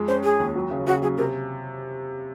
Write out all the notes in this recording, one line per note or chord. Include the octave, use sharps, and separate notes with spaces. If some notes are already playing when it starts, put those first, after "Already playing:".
Already playing: F2 G#3
C#4 C5
G#3 G#4
D#2
F#3
C#3
C#3 F#4
F#3 G#4
C3 A#4